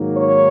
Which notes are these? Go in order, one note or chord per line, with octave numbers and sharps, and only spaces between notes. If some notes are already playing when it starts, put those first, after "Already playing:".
Already playing: G#2 D#3 F#3 A#3
C#5